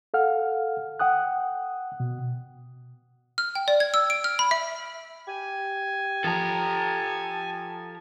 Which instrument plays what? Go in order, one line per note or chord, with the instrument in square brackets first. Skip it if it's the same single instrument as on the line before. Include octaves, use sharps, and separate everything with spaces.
[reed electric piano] A4 F5 F#5 F6
F#5 G5 D#6 F#6
B2
[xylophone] F6
G5
D5
G#6
E6
D7
F6
B5
E5
[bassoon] G4 [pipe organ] G#5
[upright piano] F3 [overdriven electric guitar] A4 A#5